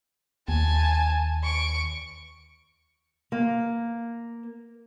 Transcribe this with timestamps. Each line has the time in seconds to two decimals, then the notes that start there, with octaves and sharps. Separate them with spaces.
0.48 D#2 G#5 A5
1.43 C#6 D7
3.32 A#3